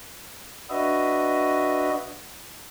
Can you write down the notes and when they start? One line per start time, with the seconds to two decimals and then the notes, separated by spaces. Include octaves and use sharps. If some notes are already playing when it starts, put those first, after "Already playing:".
0.70 D4 F#4 B4 D#5 E5